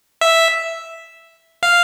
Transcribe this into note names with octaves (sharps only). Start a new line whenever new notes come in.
E5
F5